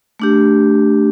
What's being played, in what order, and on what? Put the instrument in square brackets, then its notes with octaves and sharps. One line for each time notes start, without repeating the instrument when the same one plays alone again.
[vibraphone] A3 D4 G4